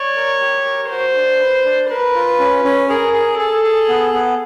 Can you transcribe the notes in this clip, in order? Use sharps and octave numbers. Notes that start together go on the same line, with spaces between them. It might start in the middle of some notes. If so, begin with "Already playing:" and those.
Already playing: C#5 D5
A#4
G4
A#4
F#4 C5
D4
B4
D4
A#4 B4
F4
C#4
C#4
G#4 A#4
G#4
G#4 A4
G#4
B3
B3